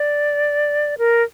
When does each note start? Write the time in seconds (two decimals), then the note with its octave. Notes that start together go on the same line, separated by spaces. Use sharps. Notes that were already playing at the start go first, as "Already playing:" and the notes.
Already playing: D5
0.98 A#4